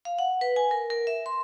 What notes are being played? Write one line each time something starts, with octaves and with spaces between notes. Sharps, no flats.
F5
F#5
B4
G#5
A#4
A#4
E5
C6